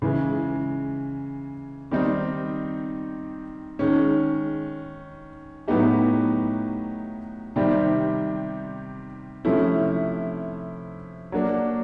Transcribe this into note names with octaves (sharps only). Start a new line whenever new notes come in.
C#3 E3 G#3
D#3 G3 C4 D#4
D#3 G#3 C#4
A2 F#3 B3 D#4 G4
C3 D#3 G3 C4
C3 F3 A3 C#4 E4
F#3 A#3 D4